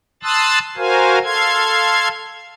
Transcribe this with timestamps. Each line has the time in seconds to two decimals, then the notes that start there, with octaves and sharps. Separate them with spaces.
0.23 A5 C6 D#6 E6 F#6 A6
0.77 F#4 A#4 C5 F5 G#5
1.24 A4 F5 C6 G#6